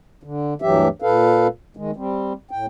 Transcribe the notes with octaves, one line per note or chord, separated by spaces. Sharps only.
D3
D2 G2 E3 F#3 G4 E5
A#2 A4 B4 F5
D#3 G#3
G3 C4
A2 G5